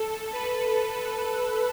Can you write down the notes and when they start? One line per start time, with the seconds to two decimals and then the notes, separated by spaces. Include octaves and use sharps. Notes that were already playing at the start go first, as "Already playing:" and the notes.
Already playing: A4
0.33 B4